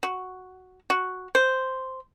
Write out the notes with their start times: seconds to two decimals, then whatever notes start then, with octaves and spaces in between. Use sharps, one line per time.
0.03 F#4
0.90 F#4
1.35 C5